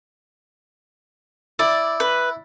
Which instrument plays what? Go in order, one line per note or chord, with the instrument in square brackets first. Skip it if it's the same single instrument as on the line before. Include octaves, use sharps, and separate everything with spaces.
[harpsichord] E4 [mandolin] D5
[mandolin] B4